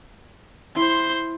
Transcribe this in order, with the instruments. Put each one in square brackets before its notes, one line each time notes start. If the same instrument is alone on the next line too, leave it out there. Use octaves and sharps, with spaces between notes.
[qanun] E4 [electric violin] C5 C6